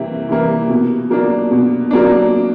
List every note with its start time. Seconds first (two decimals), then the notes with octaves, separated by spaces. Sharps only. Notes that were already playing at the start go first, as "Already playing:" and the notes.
Already playing: C3 E3 G3 A#3
0.29 E3 G3 A#3
0.69 B2
1.10 F#3 A#3 D4
1.51 B2
1.91 F#3 A#3 D4